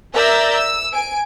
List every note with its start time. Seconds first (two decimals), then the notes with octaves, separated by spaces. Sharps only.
0.13 A#4 D5 E5 A#5 E6 G6
0.53 E6
0.93 G#5 D7